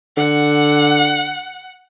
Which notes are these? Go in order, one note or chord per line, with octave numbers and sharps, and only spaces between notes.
D3 F#5